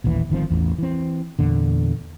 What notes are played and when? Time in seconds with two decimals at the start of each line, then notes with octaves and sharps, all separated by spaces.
0.04 D#1 A1 D#2 E3
0.30 G1 D#3 F3 C4
0.50 A1 E2
0.78 E3 C4
1.39 E2 A#2 D3